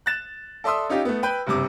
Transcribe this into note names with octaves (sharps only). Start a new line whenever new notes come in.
F#6 A6 E7
A4 D5 E5 C6 D#6 E6
C#4 D#4 F4 G4
A3 B3
B4 G5 B5 G6
F#1 G2 C3 D6